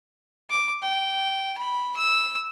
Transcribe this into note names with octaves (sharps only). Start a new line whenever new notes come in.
D6
G5
B5
E6